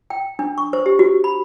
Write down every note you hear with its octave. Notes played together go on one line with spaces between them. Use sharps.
G5
D4
C#6
C5
G4
F#4
B5